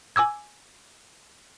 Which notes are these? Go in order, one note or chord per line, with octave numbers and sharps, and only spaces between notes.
G#5 D6 E6 G#6